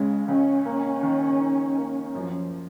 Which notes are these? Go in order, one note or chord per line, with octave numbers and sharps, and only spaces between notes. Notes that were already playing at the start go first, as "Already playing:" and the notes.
Already playing: C#2 C#3 G#3
C#2 C#4
A#3
D#3
D#4
A#3
F#2 F3